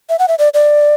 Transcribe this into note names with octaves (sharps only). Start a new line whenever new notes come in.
E5
F#5
E5
D5
D5